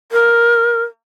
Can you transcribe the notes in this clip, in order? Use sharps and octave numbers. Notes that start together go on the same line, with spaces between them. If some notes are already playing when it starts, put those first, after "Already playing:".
A#4